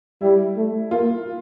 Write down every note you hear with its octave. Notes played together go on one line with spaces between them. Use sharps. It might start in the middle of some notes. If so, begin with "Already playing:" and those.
G3 E4
A3
A#3 F4